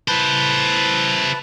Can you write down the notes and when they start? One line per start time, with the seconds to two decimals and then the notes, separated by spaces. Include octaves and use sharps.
0.08 E4 B4 C5 A5